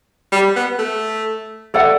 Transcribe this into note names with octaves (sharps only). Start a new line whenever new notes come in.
G3
B3
A3
A4 D5 F#5